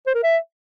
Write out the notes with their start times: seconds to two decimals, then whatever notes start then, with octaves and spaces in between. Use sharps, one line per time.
0.06 C5
0.15 A#4
0.23 E5